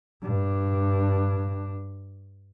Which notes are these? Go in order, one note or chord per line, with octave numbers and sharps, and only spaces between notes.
G2 D4